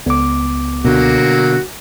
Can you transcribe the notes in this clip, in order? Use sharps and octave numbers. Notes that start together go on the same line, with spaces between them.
C#2 B3 D6
B2 D3 F#3 A#3 F#4